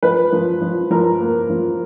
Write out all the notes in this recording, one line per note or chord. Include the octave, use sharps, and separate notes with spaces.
F3 B4
F3
F3
F3 A#4
A#3
F3